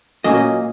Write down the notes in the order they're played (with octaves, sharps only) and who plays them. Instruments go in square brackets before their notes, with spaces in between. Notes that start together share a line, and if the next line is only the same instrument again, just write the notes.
[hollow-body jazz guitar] A#2 F#3 A#3 C#4 D#5